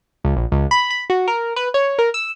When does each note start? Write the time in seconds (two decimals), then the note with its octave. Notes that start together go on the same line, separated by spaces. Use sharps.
0.24 C#2
0.37 A#1
0.52 C#2
0.71 B5
0.91 B5
1.10 F#4
1.28 A#4
1.56 B4
1.74 C#5
1.99 A#4
2.14 E6